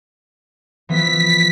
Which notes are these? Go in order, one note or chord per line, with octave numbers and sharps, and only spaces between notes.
E3 F3 B3 B6